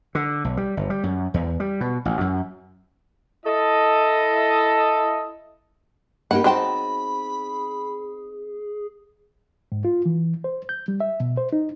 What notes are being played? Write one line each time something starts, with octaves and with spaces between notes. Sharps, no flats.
D3
B1
G3
G1
G3
F#2
E2
G3
B2
A1
F#2
E4 A4 D#5
A#3 D#4 G4 F#5 B5
F#3 C4 D#4 G#4 C5 G5 A5
G#2
F4
E3
C5
G6
G3
E5
B2
C5
D#4